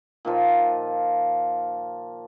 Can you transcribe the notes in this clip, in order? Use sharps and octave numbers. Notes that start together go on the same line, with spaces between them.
A#2 D#3 F3